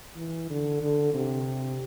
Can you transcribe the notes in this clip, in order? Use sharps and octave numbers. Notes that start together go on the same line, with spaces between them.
E3
D3
D3
C3